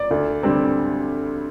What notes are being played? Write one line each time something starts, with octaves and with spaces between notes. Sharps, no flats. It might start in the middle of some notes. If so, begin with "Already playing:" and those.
Already playing: D5
D2
D3 G3 C4